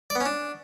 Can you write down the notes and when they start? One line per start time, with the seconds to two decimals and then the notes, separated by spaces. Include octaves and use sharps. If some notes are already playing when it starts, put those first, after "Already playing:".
0.10 D5
0.15 B3
0.20 C#4
0.26 D4